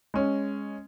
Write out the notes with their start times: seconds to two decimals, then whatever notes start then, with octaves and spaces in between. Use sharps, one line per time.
0.14 G#3 C#4